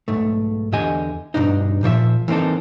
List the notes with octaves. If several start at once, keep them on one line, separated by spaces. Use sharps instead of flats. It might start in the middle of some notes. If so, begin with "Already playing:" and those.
B1 G#2 A3
E2 D3 G4 D#5 G#5
G2 B2 D4 D#4
A#2 F3 C#5 E5
E3 A#3 C4 D#4 A4